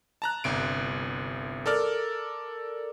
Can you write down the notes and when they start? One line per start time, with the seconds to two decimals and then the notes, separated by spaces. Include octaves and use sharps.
0.22 A5 A#5 F#6
0.44 G1 C2 D7
1.66 A4 A#4 D5 F6